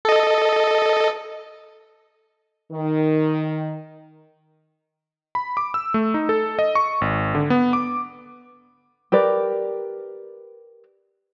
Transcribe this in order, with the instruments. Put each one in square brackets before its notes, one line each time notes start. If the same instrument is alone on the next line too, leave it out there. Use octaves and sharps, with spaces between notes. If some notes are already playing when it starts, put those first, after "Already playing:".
[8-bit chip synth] A4 D#5
[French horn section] D#3
[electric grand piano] B5
D6
E6
A3
D#4
A4
D#5
C#6
G#1
D3
B3
D6
[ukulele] G4 A#4 B4 D5